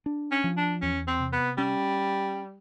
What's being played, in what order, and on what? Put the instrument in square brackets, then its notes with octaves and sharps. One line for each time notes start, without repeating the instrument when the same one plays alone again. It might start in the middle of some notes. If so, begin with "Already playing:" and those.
[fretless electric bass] D4
[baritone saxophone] C#4
[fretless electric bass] F3
[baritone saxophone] D4
[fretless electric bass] E2 [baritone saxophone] C#4
[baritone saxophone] C4
[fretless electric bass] C3
[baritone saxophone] B3
[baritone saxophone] G3 [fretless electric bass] C#4